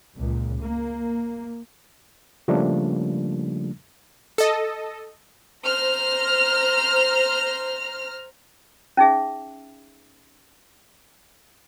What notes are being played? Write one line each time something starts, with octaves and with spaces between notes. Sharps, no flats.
C#2 A#2
A#3
C#3 F3 G3 A3 A#3 D4
A4 D#5
C5 A#5 F6
C#4 D#4 G#4 E5